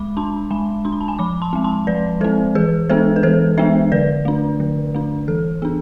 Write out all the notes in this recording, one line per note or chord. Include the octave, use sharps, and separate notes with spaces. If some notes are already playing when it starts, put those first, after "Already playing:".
Already playing: G#3 B5 D6
D4 A5 C6
G#3 G#5 B5
D4 C6
B5
A5
G#5 B5
F3 B5 D6
A5 C6
G#3 C4
A5 C6
F3 B4 D5
G#3 C4 A4 C5
E3 G#4 B4
G#3 B3 D4 A4 C5
B4
E3 A4 C5
G#3 B3 D4 C5 E5
D3 B4 D5
A3 D4
D3
A3 D4
E3 A4
B3 D4 G#4